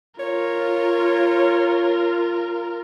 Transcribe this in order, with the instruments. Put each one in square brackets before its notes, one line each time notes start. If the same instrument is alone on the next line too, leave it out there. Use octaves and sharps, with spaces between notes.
[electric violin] F4 A#4 [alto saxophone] C#5